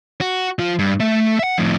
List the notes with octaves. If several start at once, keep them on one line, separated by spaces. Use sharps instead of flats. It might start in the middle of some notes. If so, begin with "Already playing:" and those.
F#4
F3 F4
G2
A3 E5
E5 F#5
F2 A2